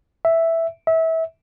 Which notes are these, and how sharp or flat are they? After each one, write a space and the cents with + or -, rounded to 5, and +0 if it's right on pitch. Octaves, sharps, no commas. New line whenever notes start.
E5 +0
E5 -25